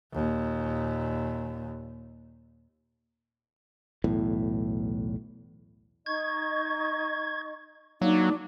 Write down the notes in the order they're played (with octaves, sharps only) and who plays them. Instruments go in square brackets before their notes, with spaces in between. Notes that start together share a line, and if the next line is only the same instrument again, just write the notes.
[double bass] D#2 A#2
[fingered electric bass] B1 E2 A2
[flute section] D#4 D#5 C#6 [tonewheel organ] G#6
[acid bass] F#3 [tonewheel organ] A#3 [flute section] D4 D5 D6 [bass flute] D#4